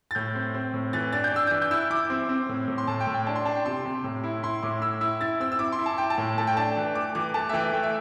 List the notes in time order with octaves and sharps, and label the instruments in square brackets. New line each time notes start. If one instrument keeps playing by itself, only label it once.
[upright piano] A6
[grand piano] A2 [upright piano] G6
[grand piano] C4
C4
A2
[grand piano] E3 [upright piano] A6
[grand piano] D4 [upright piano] A6
[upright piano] G6
[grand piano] D4 [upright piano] E6
[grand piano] E3 [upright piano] G6
[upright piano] G6
[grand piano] E4 [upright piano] E6
[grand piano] E4 [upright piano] D6
[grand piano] C4
C4
A2
A2
[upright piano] C6
[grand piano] A2 [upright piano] A5
[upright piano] G5
[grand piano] A2
[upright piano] G5
[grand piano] D4 [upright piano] A5
[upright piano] C6
[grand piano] D4 [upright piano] A5
[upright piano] G5
[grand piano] C3 [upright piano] C6
[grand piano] C3
A2
E4
[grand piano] E4 [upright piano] C6
[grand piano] A2 [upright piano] D6
[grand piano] E4 [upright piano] E6
[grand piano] E4 [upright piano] E6
[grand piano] E4 [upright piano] A6
[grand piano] C4 [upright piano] E6
[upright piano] E6
[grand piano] E4 [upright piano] D6
[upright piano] C6
[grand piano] E4
[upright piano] A5
[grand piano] E4 [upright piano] G5
[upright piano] A5
[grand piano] A2
[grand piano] A3 [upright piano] A5
[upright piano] G5
[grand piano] D4 [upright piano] A5
[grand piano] E3
[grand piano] A3 [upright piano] D6
[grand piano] E3 [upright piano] D6
[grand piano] A3 [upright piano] A5
[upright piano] E5
[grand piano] E3 [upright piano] G5
[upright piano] E5
[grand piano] A3 [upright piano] G5
[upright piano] E5